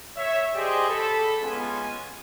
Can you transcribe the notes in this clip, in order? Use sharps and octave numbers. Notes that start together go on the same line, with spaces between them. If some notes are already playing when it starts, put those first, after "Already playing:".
C#5 E5
G4 G#4 C5 D5 D#5
A4 B5
G#3 B3 C#4 F4 G#5